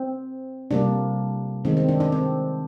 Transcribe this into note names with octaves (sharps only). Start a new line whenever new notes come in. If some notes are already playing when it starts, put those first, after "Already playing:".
Already playing: C4
C3 G3 A#3 D4
D#3 G#3 C4
C4
D4
D4
C4